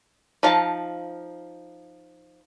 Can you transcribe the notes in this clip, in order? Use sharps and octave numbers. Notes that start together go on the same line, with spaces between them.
F3 D#4 F5 A5